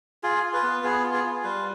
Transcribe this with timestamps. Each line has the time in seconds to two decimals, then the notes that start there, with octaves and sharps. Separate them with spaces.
0.23 F4 G#4
0.44 F4
0.53 B4
0.63 B3
0.83 B3 G#4
1.04 F4
1.13 G#4
1.24 F4
1.43 G3 B4